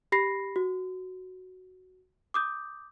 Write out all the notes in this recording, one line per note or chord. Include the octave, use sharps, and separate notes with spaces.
G4 B5 A#6 C7
F#4
D6 D#6 G6